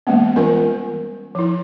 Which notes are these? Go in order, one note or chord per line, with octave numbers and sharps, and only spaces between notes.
E3 G#3 A#3 B3 C#4
E3 G3 C#4 F4 A#4 G#5
F3 E4